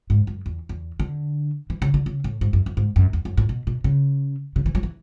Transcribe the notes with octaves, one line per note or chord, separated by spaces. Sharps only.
G#2
F#2
E2
E2
D3
E3
C#3
D3
C#3
A2
G#2
F#2
F#2
G#2
F#2
E2
F#2
A2
B2
B2
C#3
C#3
E3
F#3
E3